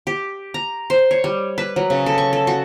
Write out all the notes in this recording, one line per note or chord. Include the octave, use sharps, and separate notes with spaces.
G4
A#5
C5
C#5
G3
B4
F#3
C#3
A4
C#6
A4
F#4